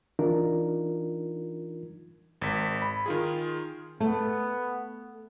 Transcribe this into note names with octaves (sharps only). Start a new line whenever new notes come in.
E3 D4 D#4 F4 A#4
G#1 B6
B5
D#3 F4 G#4
A3 B3